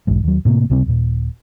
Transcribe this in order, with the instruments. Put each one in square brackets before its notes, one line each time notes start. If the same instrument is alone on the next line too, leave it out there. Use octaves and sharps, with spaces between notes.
[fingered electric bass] B1 E2 G#2
D#2 F#3
A2 C3 A3 A#3
C#2 C3 G3 C4
D#1 A#2